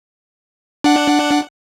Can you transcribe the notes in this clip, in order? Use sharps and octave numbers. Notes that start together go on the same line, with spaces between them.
D4 F#5